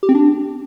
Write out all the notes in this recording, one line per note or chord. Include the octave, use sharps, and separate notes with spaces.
G4
C4
D4